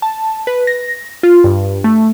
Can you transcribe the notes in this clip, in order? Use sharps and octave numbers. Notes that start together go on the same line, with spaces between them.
A5
B4
A#6
F4
G2
A3